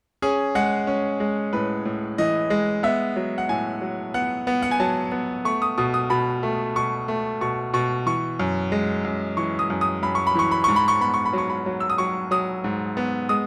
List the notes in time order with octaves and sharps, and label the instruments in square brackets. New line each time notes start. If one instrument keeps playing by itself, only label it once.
[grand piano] C#4 G#4
G#3 F#5
C#4
G#3
A2 B4
A2
E3 D#5
G#3
B3 E5
F#3
F#5
A2 G#5
F#3
B3 F#5
B3
F#5
G#5
F#3 A5
B3
A3 C#6
D#6
B2 D#6
D#6
B2 B5
A3
B2 C#6
A3
B2 C#6
B2 C#6
E3 C#6
F#2
G#3
F#2
E3 C#6
D#6
F#2
D#6
F#2 B5
C#6
B5
E3 C#6
B5
G#2 C#6
B5
C#6
B3 B5
C#6
B5
F#3 C#6
B5
F#3
E6
D#6
F#3 C#6
F#3 D#6
G#2
B3
G#3 D#6